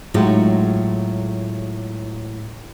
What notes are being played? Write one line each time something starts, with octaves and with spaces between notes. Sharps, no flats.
A2 F#3 G#3 D#4 F4 F#4